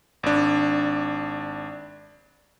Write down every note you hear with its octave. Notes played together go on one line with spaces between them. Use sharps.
G#1 D4